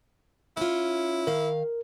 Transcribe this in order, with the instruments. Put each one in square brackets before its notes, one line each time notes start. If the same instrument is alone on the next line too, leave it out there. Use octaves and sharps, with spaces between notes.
[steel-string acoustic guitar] C#4 F4 [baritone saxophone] E4
[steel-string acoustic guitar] D#3 F5 [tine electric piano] A#4